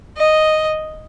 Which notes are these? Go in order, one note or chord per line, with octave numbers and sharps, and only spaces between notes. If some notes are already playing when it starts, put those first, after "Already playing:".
D#5